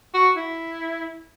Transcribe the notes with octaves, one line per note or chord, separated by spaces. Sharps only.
F#4
E4